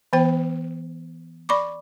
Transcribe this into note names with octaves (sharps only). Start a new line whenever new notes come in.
E3 B3 C5 G5
D5 B5 C#6 D6